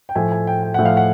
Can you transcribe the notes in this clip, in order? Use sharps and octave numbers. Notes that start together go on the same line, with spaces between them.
G5
A2 F3 A3 G#5
G#5
G5
G5
A2 F3 A3 F#5
F5
F#5